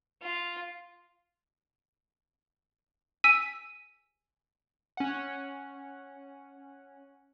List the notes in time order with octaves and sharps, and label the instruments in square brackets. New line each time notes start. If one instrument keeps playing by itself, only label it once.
[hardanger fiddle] F4
[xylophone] G#5 E6 B6 D#7
[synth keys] C#4 F#5